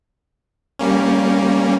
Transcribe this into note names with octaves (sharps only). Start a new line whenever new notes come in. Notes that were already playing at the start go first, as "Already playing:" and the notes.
G3 A#3 C#4